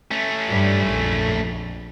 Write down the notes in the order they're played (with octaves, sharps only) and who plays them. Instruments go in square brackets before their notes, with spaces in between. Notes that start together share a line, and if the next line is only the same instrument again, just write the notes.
[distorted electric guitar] A3 C#4
[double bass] G2 G3
A#1 F2